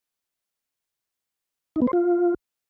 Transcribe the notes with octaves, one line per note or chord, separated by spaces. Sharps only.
D#4
B3
C5
F4